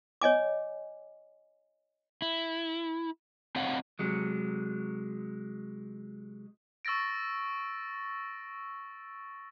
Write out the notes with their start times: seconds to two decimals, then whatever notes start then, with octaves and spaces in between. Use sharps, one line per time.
0.22 C#5 D#5 G#5 D6
2.22 E4
3.56 C4 C#5 D#5 F5 F#5
3.99 C3 F#3 G#3
6.85 C#6 E6 A6 A#6 D7